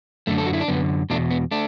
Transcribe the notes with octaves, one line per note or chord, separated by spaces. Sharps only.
F#2 D3 A3
A4
F#4
E4
D4
F#2 D3 B3
E2 B2 A3 D4
B3
A3 D4